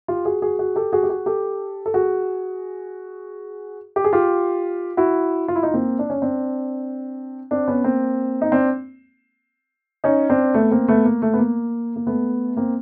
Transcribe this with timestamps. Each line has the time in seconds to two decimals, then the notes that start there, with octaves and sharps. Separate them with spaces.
0.08 F4 G4
0.25 F#4 G#4
0.42 F#4 G#4
0.59 F#4 G#4
0.76 G4 A4
0.93 F#4 G#4
1.03 G4
1.09 F#4 G#4
1.26 G4 A4
1.86 A4
1.94 F#4 G#4
3.96 G4
4.04 G#4
4.13 F4 G4
4.97 E4 F#4
5.48 F4
5.56 E4
5.63 D#4 F4
5.74 A#3 C4
5.99 D4
6.10 C#4
6.22 C4 D4
7.51 C4 D4
7.68 B3 C#4
7.84 A#3 C4
8.42 D#4
8.52 C4 D4
10.04 C#4 D#4
10.29 C4 D4
10.54 A3 B3
10.71 A#3 C4
10.88 A3 B3
11.05 A#3
11.22 A3
11.33 B3
11.38 A#3
11.96 A#3
12.07 A3 B3
12.57 A#3 C4